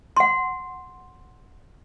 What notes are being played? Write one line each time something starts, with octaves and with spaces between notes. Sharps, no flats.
F#5 C6